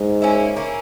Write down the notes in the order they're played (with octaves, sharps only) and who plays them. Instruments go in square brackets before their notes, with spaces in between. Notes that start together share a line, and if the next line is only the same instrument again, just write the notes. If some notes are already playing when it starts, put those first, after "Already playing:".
Already playing: [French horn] G#2
[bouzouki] A#3 C#4 E4
A#3 C#4 E4